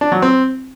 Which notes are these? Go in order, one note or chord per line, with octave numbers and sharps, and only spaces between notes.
D4
F#3
C4